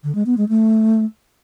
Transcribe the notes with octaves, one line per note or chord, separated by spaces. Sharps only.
D3
G#3
B3
G#3
A3